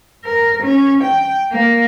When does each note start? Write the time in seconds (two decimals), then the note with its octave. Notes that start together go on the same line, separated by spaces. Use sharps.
0.24 A#4
0.63 C#4
1.03 G5
1.52 A#3